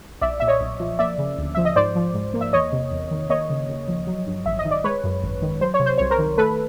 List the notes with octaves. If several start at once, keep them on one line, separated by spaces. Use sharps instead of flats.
B1 D5 E5
A#2 E5
C#5 D#5
B1
F3
A#3 D5 E5
C#3
D2
F3 E5
D#5
G#2 C5 D5
F3
G#2
A#3
E5
E2 C#5 D#5
C3
E2
D#3
A#3 C#5 D#5
C#3
D#2
F3
F#3
G2
A1 E5
D#5
D#3
D5
G#3 B4 C#5
F#2
G#1
D#3
F#3 C5
C#5
C3
C5
C2 C#5
A#4 C5
D#3
A3 A4 B4